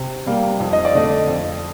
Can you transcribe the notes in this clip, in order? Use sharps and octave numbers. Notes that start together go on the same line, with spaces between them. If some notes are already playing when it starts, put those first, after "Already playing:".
Already playing: C3
G3 A#3
F2
D#5
D5
D3 A3 D#5
F2